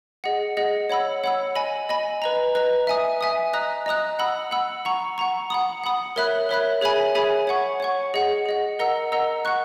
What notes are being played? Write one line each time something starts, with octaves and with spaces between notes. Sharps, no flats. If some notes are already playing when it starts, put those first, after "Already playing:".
G#4 D#5 F#5
G#4 D#5 F#5
C#5 F#5 B5 E6
C#5 F#5 B5 E6
D#5 G#5 B5
D#5 G#5 B5
B4 D#5 A#5
B4 D#5 A#5
E5 G#5 D#6
E5 G#5 D#6
D#5 A#5 D#6 F#6
D#5 A#5 D#6 F#6
F#5 B5 E6
F#5 B5 E6
F#5 A#5 C#6
F#5 A#5 C#6
F#5 B5 D#6
F#5 B5 D#6
A#4 C#5 E5 B5 F#6
A#4 C#5 E5 B5 F#6
G#4 C#5 E5 G#5 B5
G#4 C#5 E5 G#5 B5
C#5 F#5 C#6
C#5 F#5 C#6
G#4 D#5 F#5
G#4 D#5 F#5
A#4 D#5 F#5 A#5 E6
A#4 D#5 F#5 A#5 E6
F#5 C#6 F#6